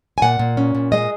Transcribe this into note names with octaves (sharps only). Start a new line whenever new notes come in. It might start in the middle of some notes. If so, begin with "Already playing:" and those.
G#5
A#2 F#5
A#2
C#4
A#2
G#3 D#5